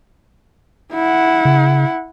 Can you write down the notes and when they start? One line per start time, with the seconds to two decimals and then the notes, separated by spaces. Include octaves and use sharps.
0.93 E4 F#5
1.45 C#3